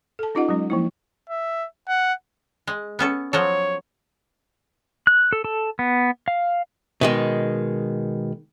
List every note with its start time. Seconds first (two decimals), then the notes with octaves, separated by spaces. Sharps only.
0.19 A4 A5
0.35 C#4 D#4 F4 G4 D#5 F#5
0.49 F#3 G#3 C#4
0.70 F3 A#3 E4
1.30 E5
1.88 F#5
2.67 G#3
2.99 B3 C#4 A4
3.33 F3 F#3 A4 C#5
5.07 F#6
5.33 A4
5.44 A4
5.79 B3
6.28 F5
7.01 B2 D#3 G#3